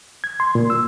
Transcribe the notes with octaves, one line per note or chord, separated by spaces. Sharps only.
G#6
C6
A#2
E6